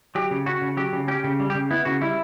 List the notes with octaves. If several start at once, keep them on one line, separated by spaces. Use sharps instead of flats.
F#3 G4
C#3
C#4 F#4
C#3
F#3 G4
C#3
C#4 G4
C#3
G3
G4
C#3
B3 E4
C#3 F#4
G3 E4